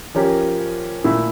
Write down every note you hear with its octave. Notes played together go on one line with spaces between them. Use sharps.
F3 C#4 G4 A#4
A#2 A3 E4